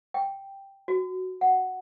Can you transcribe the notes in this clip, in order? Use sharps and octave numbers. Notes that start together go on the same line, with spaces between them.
G5
F#4
F#5